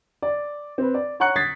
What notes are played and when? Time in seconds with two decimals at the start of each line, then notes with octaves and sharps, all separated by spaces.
0.22 D5
0.78 C4 B4
0.94 D5
1.20 C#5 F#5 A#5 C#6 F#6 C#7
1.36 D#6 G#6 A6 B6 C7